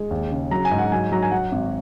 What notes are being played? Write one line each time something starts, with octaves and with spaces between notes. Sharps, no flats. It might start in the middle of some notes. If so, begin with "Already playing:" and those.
Already playing: G#3
D#2
C#3
F#3 A#5
G#5
G#2
F#5
F#3 G#5
F#3 A#5
G#5
F#3 F#5
G#1